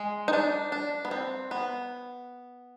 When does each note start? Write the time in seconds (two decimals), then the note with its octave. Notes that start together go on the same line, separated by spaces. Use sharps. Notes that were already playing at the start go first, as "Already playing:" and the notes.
Already playing: G#3
0.28 D#4
0.33 D4
0.72 D4
1.05 B3
1.11 C4
1.51 B3